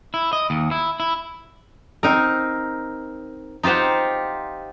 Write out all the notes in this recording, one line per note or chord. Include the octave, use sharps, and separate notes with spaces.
E4
D#5
D#2
E4
E4
C4 D#4 A#4
D#4 F4 G4 C5 F#5